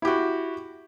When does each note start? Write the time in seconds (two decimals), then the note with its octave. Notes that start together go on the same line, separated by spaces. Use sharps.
0.02 E4
0.05 G4
0.07 F#4